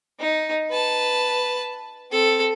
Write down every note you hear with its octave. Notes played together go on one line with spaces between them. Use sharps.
D#4
B4 A5
C4 A4